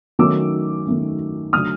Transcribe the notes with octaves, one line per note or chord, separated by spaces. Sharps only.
D#3 F#3 A3 C#4 D6 E6
D#3 F#3 A3 C#4
D3 F#3 A3 D#6 F6